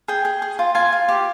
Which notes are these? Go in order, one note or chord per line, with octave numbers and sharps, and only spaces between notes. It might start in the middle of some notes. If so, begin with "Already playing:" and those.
G#4 G5
G#4
G#4
F4
F4 G#5
F4
G4